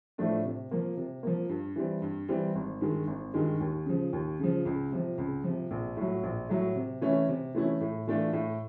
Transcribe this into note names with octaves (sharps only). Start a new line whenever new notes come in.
A2 F3 A3 D4
C3
F3 A#3
C3
F3 A#3
G2
E3 G3 C4
G2
E3 G3 C4
G#1
G2 D#3 G#3
G#1
G2 D#3 G#3
D#2
C#3 F3
D#2
C#3 F3
C#2
C3 F3
C#2
C3 F3
A#1
A2 F#3
A#1
A2 F#3
C3
E3 A3 C#4 E4
C3
E3 A3 C#4 E4
A2
E3 A3 D4 F4
A2